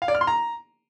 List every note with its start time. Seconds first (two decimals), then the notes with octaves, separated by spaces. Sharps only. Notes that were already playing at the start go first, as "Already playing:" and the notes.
0.02 F5
0.08 D5
0.15 F6
0.21 C6
0.27 A#5